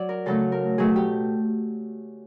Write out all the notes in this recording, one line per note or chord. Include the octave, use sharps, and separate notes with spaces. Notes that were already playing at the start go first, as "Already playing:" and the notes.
Already playing: F#3 D5
A#4
C#3 F#3 A3 A4
A#4
B2 F#3 A3 G#4
G4